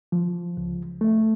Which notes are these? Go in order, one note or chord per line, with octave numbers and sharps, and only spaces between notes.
F3
C#2
A3